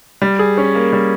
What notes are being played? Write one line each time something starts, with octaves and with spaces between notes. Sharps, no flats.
G3
G#4
C#4
A#3
G3